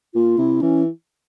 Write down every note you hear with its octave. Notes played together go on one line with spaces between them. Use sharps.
A#2 F4
C3 E4
E3 C#4